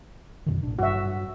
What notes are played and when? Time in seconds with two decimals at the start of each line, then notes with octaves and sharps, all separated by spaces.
0.46 F#2 B2 D#3
0.63 A1 D4
0.79 G2 F#4 E5